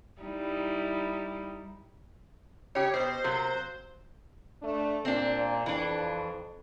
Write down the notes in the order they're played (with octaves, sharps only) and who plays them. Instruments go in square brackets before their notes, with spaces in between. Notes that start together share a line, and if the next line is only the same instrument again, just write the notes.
[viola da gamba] G3 D#4 E4
[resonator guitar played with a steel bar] C#3 G4 [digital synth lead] C#5
[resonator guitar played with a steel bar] B2 [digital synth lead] C5
[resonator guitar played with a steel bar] C3 F#3 A#3
[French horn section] A3 D4
[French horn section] A#2 [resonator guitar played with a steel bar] C4 D4
[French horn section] F2 [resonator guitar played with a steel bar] E3 D4